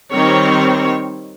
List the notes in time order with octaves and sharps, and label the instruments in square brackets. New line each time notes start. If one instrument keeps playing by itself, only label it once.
[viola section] D#3 G3 C4 C#5